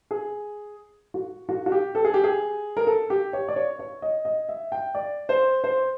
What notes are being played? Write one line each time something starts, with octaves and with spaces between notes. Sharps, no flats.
G#4
F#4
F#4
F#4
G4
A4
G#4
G4
G#4
A#4
A4
G4
C#5
D5
C#5
C#5
D#5
D#5
E5
G5
D5
C5
C5